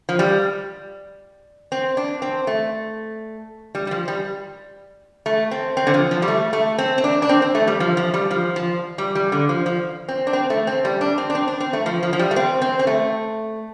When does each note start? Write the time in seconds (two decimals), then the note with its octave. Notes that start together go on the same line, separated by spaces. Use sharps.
0.09 F3
0.19 G3
1.72 C4
1.97 D4
2.22 C4
2.47 A3
3.75 G3
3.87 G3
3.91 F3
4.08 G3
5.26 A3
5.51 C4
5.77 C4
5.87 D3
5.94 F3
6.11 F3
6.22 G3
6.28 A3
6.53 A3
6.78 C4
6.98 C4
7.04 D4
7.22 D4
7.29 C4
7.42 C4
7.55 A3
7.67 G3
7.80 F3
7.97 F3
8.14 G3
8.31 F3
8.56 F3
8.98 G3
9.15 G3
9.32 D3
9.49 F3
9.66 F3
10.08 C4
10.27 D4
10.33 C4
10.50 A3
10.67 C4
10.85 G3
11.01 D4
11.18 C4
11.30 D4
11.35 C4
11.48 D4
11.60 C4
11.73 A3
11.86 F3
12.03 F3
12.13 F3
12.19 G3
12.31 A3
12.36 C4
12.62 C4
12.79 C4
12.87 A3